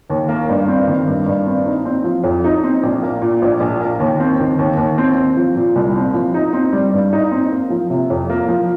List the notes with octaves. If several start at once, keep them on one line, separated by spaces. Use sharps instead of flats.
D#2
A#3
G2
C4
D#3
G2
G2
C4
D#4
C4
F3
F2
D#4
C4
A#1
A#3
A#2
A#1
A#1
A#3
D#2
C4
D#3
D#2
D#2
C4
C4
F3
A#2
C2
C4
F3
D#4
C4
G3
G2
D#4
C4
A#3
F3
C3
F2
A#3
F3